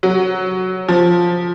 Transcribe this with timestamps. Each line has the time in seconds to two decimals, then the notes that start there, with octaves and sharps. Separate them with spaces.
0.03 F#3
0.88 F3